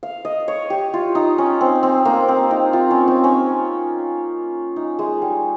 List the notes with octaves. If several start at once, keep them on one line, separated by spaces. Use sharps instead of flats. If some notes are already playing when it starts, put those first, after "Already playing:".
F5
D#5
C#5
G4
F4
D#4
C#4
C4
C4
A#3
C4
D#4
F4
C#4
C4
C#4
D#4
G#3
G3